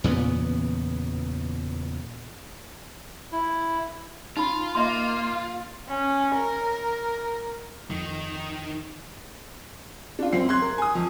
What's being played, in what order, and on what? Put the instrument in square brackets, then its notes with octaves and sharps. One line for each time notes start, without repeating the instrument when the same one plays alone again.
[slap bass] E2 A#2 C#3 B3
[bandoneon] E4
[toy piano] D#4 B5 [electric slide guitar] F4
[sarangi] A#3 [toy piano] D#5 E5 C6
[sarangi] C#4
A#4
[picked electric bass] F2 [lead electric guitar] D#3
[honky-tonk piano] D4 F4
F#2 C4 C7
C6 F#6 G#6
A#4
G#5 D#6
F2